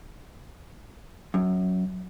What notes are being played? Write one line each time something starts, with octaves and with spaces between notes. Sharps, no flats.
F#2